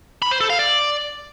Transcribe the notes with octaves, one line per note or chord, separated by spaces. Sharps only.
B5
C5
A4
F5
D5